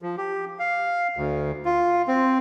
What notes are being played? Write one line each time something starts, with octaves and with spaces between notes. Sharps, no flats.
F3
G4
F5
D2
F4
C4